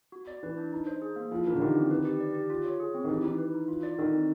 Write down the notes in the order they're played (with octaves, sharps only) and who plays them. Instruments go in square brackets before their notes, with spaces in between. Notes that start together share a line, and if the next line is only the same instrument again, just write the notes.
[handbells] F#4
D5
[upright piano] E3 [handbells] B4
[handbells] D4
D#4
C5
G#4
A#3
[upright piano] F3 [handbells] E4
[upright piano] E3 [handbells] A#4
[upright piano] D3
[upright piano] D#3 [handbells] G4
[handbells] C4
B4
G4
D5
G4
F4
C#5
G#4
C4
[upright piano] D#3
[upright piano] E3 [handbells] G4
[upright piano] E3 [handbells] D#4
[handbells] B4
D#4
F4
D5
[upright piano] D#3 [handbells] A4
[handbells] C4